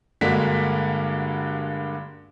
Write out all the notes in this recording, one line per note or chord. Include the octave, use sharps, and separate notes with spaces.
G2 D3 G#3 A#3 F#4 B6